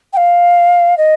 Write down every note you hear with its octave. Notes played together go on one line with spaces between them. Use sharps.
G5
F5
D#5